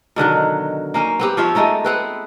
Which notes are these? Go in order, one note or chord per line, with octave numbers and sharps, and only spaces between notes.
B2 D3 D#3 F#3
A#3 C#4 D#4
B3 C4 G4
F3 F4 C#5 E5
G#3 A3 D#4 C#5
B3 C4 B4